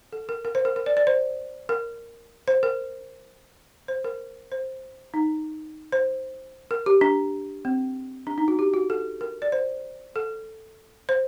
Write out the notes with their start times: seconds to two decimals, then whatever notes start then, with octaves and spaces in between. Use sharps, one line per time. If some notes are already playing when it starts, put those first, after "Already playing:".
0.13 A4
0.29 A#4
0.45 A#4
0.55 C5
0.65 A#4
0.76 A#4
0.86 D5
0.97 D5
1.07 C5
1.69 A#4
2.48 C5
2.63 A#4
3.88 C5
4.04 A#4
4.52 C5
5.14 D#4
5.92 C5
6.71 A#4
6.86 G4
7.01 D4
7.65 C4
8.27 D4
8.38 D#4
8.48 F#4
8.59 G4
8.73 F#4
8.90 A4
9.21 A#4
9.42 D5
9.52 C5
10.16 A4
11.09 C5